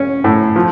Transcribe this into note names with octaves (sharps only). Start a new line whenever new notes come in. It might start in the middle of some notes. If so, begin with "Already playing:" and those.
Already playing: C#4
A2
F3